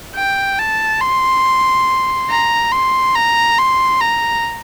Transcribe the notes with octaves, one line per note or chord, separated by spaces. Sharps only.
G5
A5
C6
A#5
C6
A#5
C6
A#5